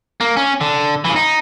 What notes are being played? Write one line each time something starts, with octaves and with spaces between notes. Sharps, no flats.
A#3
C#4
D3
C#3 E3
D#4